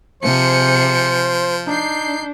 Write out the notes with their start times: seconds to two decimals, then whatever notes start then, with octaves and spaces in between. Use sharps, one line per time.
0.23 C3 F3 G#4 C5 C#7
1.67 D4 D#4 G6 C7